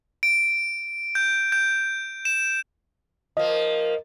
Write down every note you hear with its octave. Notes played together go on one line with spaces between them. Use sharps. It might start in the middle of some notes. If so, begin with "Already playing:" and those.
D7
G6
G6
E7
F3 A#3 D#5